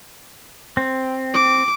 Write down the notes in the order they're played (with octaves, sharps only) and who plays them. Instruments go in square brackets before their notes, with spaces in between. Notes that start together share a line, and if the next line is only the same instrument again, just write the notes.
[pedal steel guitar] C4
[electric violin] D6